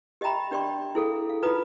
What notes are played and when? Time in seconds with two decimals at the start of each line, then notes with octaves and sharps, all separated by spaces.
0.21 G4 D#5 E5 G5 A#5 B5
0.51 D4 G4 D5 G5 C6 C#6
0.95 E4 G#4 A4 F5
1.29 F5
1.42 D#4 F4 B4 A#5 B5 D#6